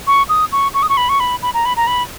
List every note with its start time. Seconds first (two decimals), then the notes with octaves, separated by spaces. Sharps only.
0.07 C#6
0.29 D#6
0.52 C#6
0.74 C#6
0.83 D#6
0.89 C#6
0.97 B5
1.09 C#6
1.20 B5
1.42 B5
1.54 A#5
1.65 B5
1.77 A#5
1.87 B5